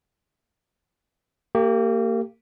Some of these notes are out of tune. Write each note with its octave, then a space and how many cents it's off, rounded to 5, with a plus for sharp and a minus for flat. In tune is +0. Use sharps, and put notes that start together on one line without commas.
A#3 -30 G4 +0